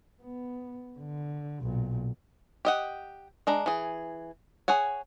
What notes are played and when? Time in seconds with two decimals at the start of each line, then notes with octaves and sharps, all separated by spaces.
0.23 B3
0.98 D3
1.62 B1 A#2
2.65 G4 D#5 F#5
3.47 G#3 D4 A#5
3.66 E3 G#4
4.68 G#4 C#5 F#5 G#5